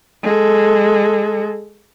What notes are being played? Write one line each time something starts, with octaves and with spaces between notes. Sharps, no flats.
G#3 A4